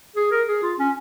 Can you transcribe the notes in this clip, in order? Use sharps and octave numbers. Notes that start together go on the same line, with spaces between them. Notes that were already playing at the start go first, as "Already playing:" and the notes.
G#4
A#4
G#4
F4
C#4